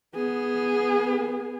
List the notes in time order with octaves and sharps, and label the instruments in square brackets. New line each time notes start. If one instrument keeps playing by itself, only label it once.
[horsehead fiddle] B3 G#4